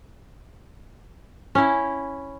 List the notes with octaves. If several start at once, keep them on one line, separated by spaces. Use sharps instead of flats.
C#4 E4